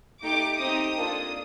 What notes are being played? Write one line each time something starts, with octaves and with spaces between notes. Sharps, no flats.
A3 D#4 G4 D6
C4 D#4 G4 D#6
A#3 D4 F4 A4